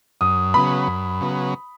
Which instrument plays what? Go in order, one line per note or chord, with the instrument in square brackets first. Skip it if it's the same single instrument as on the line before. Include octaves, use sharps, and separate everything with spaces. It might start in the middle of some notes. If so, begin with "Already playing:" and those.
[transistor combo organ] F#2 [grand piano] D#6
[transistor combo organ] C#3 F#3 B3 [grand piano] B5
[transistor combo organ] F#2
C#3 F#3 B3